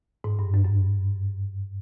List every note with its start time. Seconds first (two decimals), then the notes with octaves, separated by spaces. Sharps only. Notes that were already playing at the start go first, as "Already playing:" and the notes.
0.24 G#2
0.39 G2
0.54 F#2
0.65 F#2